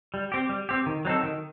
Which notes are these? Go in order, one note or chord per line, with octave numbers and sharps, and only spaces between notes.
G3
C4 G4
G3
C4 G4
D#3
F#3 C4 D#4 A4
D#3